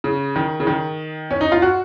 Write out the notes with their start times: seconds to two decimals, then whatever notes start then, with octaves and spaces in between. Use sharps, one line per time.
0.04 C#3
0.36 D#3
0.60 C#3
0.67 D#3
1.31 C#4
1.41 D#4
1.52 F4
1.62 F#4